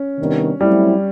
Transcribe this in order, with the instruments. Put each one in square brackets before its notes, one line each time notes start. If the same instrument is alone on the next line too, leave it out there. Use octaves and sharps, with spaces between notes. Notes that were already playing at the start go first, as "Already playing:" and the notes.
Already playing: [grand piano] C#4
[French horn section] C3 D#3 G3 B3 D4
[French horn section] F#3 A3 C4 E4 [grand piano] G3